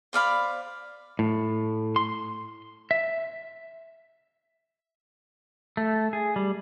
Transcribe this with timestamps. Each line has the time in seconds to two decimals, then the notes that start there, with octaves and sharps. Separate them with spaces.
0.13 C5 D5 F5 B5
1.19 A2
1.96 C6
2.91 E5
5.77 A3
6.13 G#4
6.36 G3